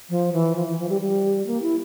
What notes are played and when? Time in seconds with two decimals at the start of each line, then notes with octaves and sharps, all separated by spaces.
0.10 F3
0.33 E3
0.56 F3
0.67 E3
0.79 F3
0.89 G3
1.01 G3
1.47 A#3
1.62 E4